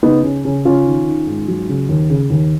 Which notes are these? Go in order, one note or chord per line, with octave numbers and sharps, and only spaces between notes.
C#3 B3 D#4
C#3 C#4
C#3 C#4
C#3 C#4 F4
D#3
D#3
G#2
F#3
C#3
D#2
C#3
D#2